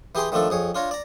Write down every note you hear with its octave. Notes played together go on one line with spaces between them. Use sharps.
E3 G4 G#4 G5 C6
D#3 F3 A3 D4 A4
F2 G#4 C#5
D4 F4 C#5 A#5
D5 A#5